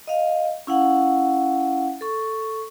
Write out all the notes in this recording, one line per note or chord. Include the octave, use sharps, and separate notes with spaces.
D#5 F5
C#4 E4 F5 F#5
A4 C#6